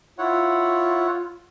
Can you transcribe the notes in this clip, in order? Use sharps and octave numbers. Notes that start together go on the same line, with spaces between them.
E4 F4 C#5 F#5